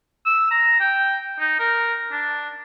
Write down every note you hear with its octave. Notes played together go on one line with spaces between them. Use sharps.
E6
A#5
G5
D#4
A#4
D4